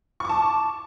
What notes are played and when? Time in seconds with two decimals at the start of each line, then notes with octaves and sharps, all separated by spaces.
0.20 C#6
0.25 D6
0.29 A5